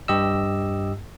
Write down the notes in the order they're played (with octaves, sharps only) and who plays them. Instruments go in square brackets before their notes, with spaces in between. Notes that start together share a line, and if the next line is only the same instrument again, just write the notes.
[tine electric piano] G2 G4 D#5 E6